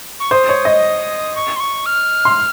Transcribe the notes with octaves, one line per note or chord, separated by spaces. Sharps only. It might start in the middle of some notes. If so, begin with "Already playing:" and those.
C#6
C5 D#6
C#5
D#5
C#6
C6
C#6
F6
C6